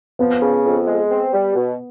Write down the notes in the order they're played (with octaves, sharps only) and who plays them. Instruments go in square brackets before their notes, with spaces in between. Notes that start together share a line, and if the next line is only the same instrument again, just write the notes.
[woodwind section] F3 [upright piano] B3
[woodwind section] C#3
F2
G#3
C4
G3
B2